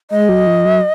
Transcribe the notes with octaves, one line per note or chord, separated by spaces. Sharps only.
G#3 D#5
F#3
F3
F#3